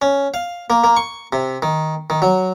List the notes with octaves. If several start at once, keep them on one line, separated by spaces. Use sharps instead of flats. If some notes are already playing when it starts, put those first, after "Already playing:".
C#4
F5
A#3
A#3
C#6
C3
D#3
D#3
F#3